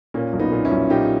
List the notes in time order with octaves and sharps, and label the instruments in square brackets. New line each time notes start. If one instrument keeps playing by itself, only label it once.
[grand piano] A#2 A#3 C#4
B1
B3 D#4
A#2
C#4 E4
B1
A#2 D#4 G4